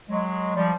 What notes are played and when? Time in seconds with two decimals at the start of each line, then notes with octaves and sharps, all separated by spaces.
0.10 F#3 G#3
0.56 F3 G3